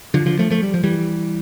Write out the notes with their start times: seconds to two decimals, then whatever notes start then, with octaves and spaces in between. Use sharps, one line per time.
0.14 D3 F3
0.26 D3 F3
0.39 F3 A3
0.50 F3 A3
0.63 G3
0.74 F3
0.83 E3 G3